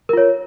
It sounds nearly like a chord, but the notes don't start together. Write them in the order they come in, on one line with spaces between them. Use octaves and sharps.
A#4 F4 C#5